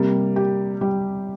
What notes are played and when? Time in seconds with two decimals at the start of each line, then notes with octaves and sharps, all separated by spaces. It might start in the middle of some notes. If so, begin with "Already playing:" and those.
Already playing: C3 G3 A#3
0.36 G4
0.81 G3